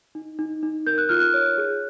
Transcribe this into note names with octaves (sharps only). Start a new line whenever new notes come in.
D#4
D#4
D#4
A#4 G6
F#6
F4 F6
F#6
C#5
G#4